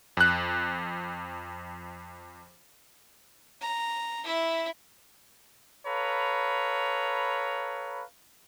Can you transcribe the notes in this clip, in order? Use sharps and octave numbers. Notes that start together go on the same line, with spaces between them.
F2 F#6
A#5
E4 E5
A4 B4 C#5 F5 A#5 B5